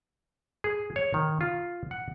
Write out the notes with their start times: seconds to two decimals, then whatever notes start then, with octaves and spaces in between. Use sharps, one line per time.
0.64 G#4
0.96 C#5
1.14 D#3
1.41 F4
1.91 F#5